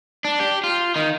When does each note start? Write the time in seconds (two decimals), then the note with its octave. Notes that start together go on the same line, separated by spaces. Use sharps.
0.25 D4
0.40 G4
0.64 F4
0.96 D#3